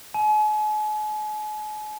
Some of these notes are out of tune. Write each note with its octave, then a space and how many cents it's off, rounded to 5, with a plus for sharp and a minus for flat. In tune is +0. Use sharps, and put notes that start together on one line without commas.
G#5 +45